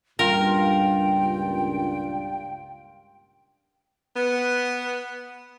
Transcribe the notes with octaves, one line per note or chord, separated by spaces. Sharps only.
C#2 G2 A#2 F4 A#4 G5
B3